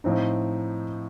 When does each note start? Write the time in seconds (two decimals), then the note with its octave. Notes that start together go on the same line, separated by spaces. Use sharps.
0.04 A2 F3 C4 D#4